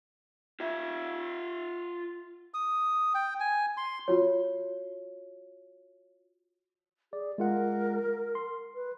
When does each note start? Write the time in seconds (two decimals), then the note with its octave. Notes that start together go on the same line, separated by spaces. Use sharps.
0.60 F4 E5
2.54 D#6
3.14 G5
3.40 G#5
3.77 C6
4.08 F4 F#4 C#5
7.13 G#4 D5
7.38 G#3 F4 A#4 F#5
8.35 C6
8.75 B4